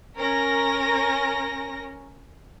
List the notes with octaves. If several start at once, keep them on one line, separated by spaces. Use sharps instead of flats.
C#4 A#4 A#6